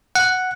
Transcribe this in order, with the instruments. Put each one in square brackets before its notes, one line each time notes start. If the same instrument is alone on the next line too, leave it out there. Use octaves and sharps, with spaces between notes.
[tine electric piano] F#5